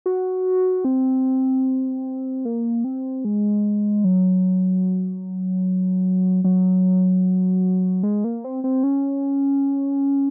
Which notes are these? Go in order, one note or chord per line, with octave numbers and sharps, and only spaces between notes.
F#4
C4
A#3
C4
G#3
F#3
F#3
G#3
A#3
C4
C4
C#4